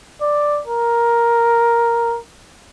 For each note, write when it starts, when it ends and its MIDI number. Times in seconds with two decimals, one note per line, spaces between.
0.22 0.61 74
0.67 2.18 70